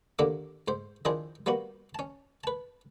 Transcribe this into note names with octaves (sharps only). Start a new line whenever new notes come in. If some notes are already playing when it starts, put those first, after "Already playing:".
D#2 D3 A#3 D4 D6
G#2 C5
D#3 F3 D4 E4 G#4 C5
G3 A#3 B3 F#4
C#4 A5
B4 A5